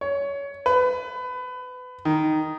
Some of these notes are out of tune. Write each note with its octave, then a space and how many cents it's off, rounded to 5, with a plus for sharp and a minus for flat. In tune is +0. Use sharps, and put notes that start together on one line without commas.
C#5 +20
B4 +25
D#3 -5